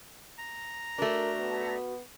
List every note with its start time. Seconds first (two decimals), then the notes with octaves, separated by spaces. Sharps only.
0.38 A#5
0.98 A3 D4 F#4 A#4
1.39 B3